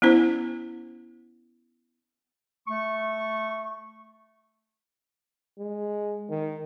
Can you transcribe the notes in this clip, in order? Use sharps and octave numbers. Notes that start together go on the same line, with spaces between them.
B3 C#4 E4 C5
A3 C#6
G#3
D#3